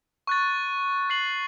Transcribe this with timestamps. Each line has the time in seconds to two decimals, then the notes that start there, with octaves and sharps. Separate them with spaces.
0.27 C#6 F#6 A6
1.10 F#6 C7 F#7